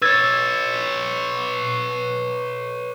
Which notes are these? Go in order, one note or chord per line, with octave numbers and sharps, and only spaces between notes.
B4 C#5 E6 G#6 A6